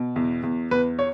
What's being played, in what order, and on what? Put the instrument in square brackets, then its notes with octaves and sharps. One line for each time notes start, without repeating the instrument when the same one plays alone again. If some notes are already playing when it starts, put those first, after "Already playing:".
Already playing: [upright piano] B2
E2
E2
E2 B4
C#5